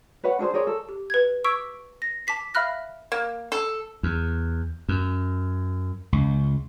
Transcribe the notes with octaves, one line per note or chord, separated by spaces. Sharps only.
B4 C#5 F#5
D4 G#4 A4 C5
G#4 A#4 C#5 D5
A4
G4
B4 G#6
C#6 D6 E6 G#6 B6 D7
A#6
A5 D6 B6 C7
E5 F5 B5 F6 F#6 A#6
A#3
A4
E2
F#2
C#2